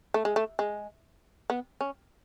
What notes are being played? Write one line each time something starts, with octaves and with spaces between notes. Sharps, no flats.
A3
G#3
A3
G#3
B3
C#4